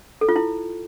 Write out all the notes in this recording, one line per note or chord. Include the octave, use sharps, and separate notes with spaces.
A4
F4
E4